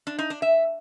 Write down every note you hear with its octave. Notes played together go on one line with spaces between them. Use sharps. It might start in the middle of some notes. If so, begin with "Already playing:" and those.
D4
D#4
D4
E5